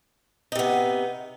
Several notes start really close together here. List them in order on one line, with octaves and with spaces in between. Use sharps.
D#4 C3 B3